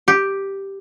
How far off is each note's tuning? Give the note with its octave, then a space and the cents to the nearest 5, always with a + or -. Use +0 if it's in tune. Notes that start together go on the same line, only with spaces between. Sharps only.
G4 +0